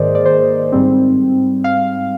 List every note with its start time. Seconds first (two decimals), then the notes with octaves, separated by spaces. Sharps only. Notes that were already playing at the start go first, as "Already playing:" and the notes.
Already playing: G#2 D#3 A#3 G#4 A#4 C5 D5 D#5
0.15 D5
0.26 C5
0.72 G#2 G3 C4
1.64 F5